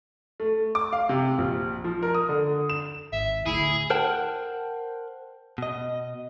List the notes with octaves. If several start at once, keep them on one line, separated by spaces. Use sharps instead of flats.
A3
D6
F5
C3
A#1
F3
A#4
D#6
D3
E7
G#1 E5
D1 D3 A3 E4 G#4
A#4 C5 F#5 G5 A5
B2 D#5